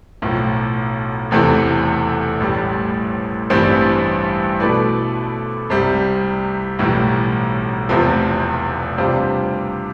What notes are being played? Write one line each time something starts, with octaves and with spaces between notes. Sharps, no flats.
B1 A2 F3
F1 E2 C3 E3 A3
A1 A2 G3
A1 G2 E3 G3 C4
B2 A3 E4 B4 D5
C2 C3 G3
B1 A2 E3 G3
F1 E2 C3 F3
C3 G3 D4 F4 C5